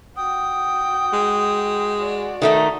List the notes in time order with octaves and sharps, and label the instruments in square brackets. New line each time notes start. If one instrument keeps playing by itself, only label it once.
[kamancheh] F#4 G5 [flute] D#6
[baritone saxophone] G#3
[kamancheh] F#4 D5
[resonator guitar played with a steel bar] D#3 A3 D#4